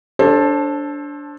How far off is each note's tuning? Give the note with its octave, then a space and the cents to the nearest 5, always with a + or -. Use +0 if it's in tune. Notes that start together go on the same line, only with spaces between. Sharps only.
D4 -15 A4 +0 C5 +30